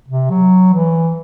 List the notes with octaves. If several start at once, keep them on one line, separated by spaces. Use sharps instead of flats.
C3
F#3
E3